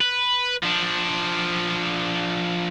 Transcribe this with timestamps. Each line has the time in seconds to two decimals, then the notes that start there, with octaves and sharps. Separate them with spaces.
0.01 B4
0.63 F3 D4